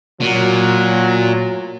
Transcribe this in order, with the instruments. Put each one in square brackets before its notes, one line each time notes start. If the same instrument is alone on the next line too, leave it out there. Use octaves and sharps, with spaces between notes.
[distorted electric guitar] A#2 [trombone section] F#3